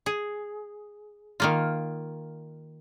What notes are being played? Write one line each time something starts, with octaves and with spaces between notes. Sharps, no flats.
G#4
D#3 A#3 F4